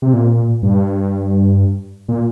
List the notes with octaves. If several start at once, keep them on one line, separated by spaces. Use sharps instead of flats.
C3
A#2
G2
A#2